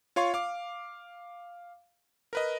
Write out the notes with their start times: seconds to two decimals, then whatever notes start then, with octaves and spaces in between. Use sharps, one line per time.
0.16 F4 C#5 F5 C6 C#6
0.34 F5 D6
2.33 A#4 B4 D#5